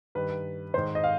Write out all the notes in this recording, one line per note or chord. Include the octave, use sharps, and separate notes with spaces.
G2 D#3 B4
G#2 D#3 C5
D#5
F5